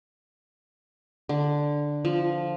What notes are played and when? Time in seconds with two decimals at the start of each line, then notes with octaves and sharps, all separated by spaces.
1.29 D3
2.05 F3